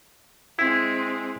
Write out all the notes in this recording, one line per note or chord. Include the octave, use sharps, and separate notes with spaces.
G#3 C4 E4